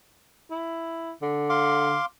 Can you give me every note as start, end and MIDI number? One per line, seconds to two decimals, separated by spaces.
0.51 1.12 64
1.22 1.97 50
1.50 2.05 77
1.50 2.05 84
1.50 2.05 86